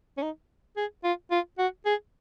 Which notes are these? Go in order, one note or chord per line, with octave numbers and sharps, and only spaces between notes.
C#4
D#4
G#4
F4
F4
F#4
G#4